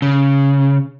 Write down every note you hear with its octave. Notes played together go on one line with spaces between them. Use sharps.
C#3